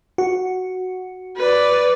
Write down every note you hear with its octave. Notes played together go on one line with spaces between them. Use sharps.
F#4
B4 D5